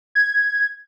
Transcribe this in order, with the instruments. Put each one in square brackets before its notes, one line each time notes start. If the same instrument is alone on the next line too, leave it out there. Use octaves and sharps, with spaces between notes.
[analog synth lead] G#6